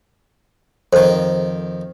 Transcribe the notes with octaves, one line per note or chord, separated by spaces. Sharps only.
F2 D#3 A4 C5